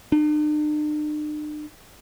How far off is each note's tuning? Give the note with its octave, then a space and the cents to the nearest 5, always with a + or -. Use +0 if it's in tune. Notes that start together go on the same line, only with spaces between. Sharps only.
D4 +45